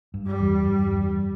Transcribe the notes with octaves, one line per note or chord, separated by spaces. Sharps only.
G2
G3
E2
G2
E2